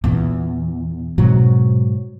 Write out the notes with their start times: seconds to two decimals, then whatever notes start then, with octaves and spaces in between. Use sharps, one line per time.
0.04 E2 A#2 C#4
1.18 G#2 B2 F#3 C4